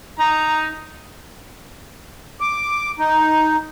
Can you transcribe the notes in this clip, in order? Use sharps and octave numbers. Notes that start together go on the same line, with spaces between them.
D#4 A#5
D6
D#4